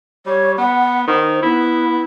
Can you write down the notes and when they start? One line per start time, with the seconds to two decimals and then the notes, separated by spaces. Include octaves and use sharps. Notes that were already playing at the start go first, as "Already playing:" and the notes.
0.26 G3 C#5
0.58 B3 F#5
1.07 D#3 C5
1.43 B3 E4